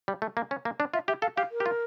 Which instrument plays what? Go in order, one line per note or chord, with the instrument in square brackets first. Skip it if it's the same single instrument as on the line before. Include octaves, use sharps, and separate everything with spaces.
[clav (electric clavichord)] G3
A3
A#3
C#4
A#3
D4
[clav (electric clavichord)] F4 [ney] E5
[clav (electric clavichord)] G4 [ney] E5
[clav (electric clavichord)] A4 [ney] F5
[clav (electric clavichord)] G4 [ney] F5
[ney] A#4
[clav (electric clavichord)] G4
F4